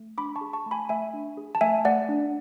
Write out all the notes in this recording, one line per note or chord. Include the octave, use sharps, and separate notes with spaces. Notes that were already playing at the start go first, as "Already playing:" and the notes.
Already playing: A3
D4 B5 D6
A5 C#6
G#4
A5 C#6
A3
G#5 B5
A3 E5 G#5
D4
G#4
A5
A3 E5 G#5
A3 D5 F#5
D4